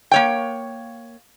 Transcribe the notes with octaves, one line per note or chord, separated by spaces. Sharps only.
A#3 C#5 G5